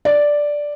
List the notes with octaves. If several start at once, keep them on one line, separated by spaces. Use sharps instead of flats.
D5